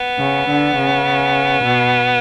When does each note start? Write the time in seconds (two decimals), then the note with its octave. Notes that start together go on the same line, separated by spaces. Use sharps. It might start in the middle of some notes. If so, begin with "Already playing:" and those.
Already playing: B3
0.19 C#3
0.49 D3
0.77 C#3
1.63 B2